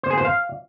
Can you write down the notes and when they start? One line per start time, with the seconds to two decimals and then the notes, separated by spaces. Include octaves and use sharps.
0.03 C5
0.11 G#4
0.18 C5
0.25 F5